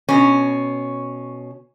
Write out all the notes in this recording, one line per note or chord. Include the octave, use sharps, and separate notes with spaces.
B2 C#4